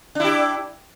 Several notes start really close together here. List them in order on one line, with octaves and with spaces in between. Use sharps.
D4 E4 G4